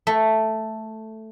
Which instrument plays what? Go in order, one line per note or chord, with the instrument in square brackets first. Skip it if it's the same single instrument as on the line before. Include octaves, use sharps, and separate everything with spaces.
[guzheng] A3